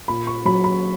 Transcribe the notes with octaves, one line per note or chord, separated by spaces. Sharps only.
A#2 B5
C#6
F#3 B5
B5